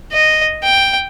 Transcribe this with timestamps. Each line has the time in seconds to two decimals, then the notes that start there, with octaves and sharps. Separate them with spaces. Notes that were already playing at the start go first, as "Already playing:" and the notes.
0.12 D#5
0.63 G5